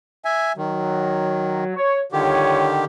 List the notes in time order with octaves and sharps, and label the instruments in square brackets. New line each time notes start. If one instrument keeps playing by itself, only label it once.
[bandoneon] E5 G#5
[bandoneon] D#3 [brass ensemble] F#3
[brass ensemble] C#5
[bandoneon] D3 D#3 G4 [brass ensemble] G3 F4 C#5